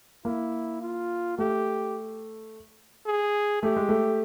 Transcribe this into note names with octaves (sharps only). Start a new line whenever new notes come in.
A#3 E4
F4
A3 G4
G#4
A3 G4
G#3
A3